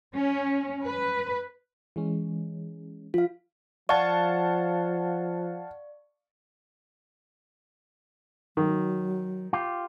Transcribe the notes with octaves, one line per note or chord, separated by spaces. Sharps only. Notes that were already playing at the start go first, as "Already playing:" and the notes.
C#4
B4
E3 G#3 C#4
F3 F4 F5
F3 D5 F5 F#5 A5 C#6
D#3 F#3
F4 G4